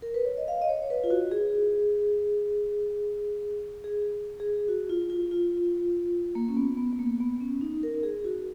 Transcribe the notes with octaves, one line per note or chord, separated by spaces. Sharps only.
A#4
B4
C#5
D#5
F5
D#5
C#5
C#5
B4
F4
F#4
G#4
G#4
G#4
F#4
F4
F4
F4
A#3
C#4
B3
B3
B3
A#3
B3
C#4
D#4
A#4
G#4
F#4